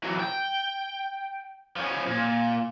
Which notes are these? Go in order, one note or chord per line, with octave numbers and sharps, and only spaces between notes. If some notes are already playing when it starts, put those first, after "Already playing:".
E3 F#3
G5
F3 C#4
A#2